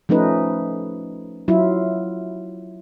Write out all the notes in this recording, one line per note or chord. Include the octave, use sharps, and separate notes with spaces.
F3 A3 C#4 D#4 B4
F#3 E4 F4